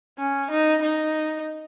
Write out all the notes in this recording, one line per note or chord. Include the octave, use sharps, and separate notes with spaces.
C#4
D#4
D#4